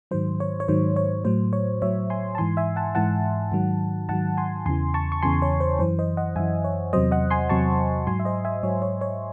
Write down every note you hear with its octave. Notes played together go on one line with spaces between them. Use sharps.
G#2 D#3 F#3 C5
C#5
C#5
G#2 D#3 F#3 C5
C#5
A2 F#3 C5
C#5
A2 F#3 C#5 E5
G#5 C6
A5
G#2 E3 G#5 C6
E5 G#5
F#5 A5
G#2 E3 F#5 A5
G#2 D#3 F#3
G#2 D#3 F#3 F#5 A5
G#5 C6
E2 C#3 E3 G#5 C6
A5 C#6
C#6
E2 C#3 E3 G#5 C6
C#5
C5
F#2 E3 C5
C5 D#5
D#5 F#5
F#2 E3 E5 G#5
C#5
E2 C3 F#3 C5 D#5
D#5 F#5
G#5 C6
E2 C3 F#3 A5 C#6
G#2 F#3 G#5 C6
E5
C5 D#5
E5 G#5
G#2 F#3 C#5
C#5
C#5